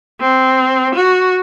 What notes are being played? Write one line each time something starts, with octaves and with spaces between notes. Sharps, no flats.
C4
F#4